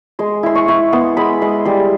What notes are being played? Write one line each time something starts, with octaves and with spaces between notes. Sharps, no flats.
G#3 C6
E4 C6
C#6
E4
B3 C6
G#3 B5
G#3 C6
G3 C6